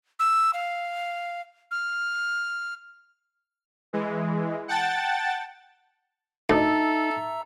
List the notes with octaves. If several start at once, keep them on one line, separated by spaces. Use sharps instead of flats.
E6
F5
F6
E3 G#3
F#5 G5 A5 A6
D2 D#4 A4 E5 A#5 E6